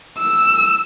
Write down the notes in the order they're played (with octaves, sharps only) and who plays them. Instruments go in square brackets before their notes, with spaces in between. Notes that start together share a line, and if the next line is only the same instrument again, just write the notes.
[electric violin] E6